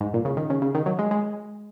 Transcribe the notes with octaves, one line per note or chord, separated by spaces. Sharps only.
G#2
A#2
C#3
D#3
C#3
C#3
D#3
F#3
G#3
G#3